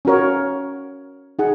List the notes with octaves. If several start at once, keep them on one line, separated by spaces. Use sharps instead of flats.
C#4 F#4 A#4 C#5
D#4 G#4 F#5